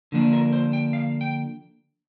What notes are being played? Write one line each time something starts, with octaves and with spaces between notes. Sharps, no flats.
D3 F3 A#3 D4
A#4
C5
G5
F5
G5